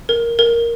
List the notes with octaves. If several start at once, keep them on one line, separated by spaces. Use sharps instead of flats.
A#4
A#4